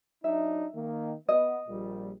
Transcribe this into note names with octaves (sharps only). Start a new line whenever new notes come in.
F#3 D4 D#4 E5
D#3 A#3
B3 D#5
A#1 A#2 G3